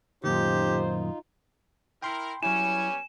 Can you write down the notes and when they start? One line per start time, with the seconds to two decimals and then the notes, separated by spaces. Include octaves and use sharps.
0.24 F#2 A#2 D#3 D#4 F4 G4 C5
2.02 E4 A#4 G5 B5 C6
2.43 F#3 G3 B3 C#4 E4 G#5 E7